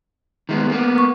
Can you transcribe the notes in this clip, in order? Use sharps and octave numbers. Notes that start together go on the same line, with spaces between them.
D#3 G#3 B3
A#3 B3
C#6